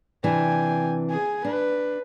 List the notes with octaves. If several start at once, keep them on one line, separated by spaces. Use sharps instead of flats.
C3 E3 D4 G5 G#5
G#4 G#5
D4 B4